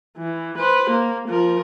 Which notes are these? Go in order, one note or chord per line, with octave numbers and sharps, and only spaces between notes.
E3
B4 C5
A#3
F3 A#4